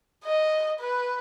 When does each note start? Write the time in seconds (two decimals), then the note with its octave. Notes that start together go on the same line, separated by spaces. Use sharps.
0.24 D#5
0.79 B4